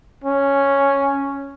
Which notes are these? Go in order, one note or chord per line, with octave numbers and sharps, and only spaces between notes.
C#4